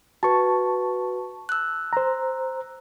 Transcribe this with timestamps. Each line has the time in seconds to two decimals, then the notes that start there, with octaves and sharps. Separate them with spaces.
0.23 F#4 B4 A5 C#6
1.49 E6 F#6
1.93 C5 A#5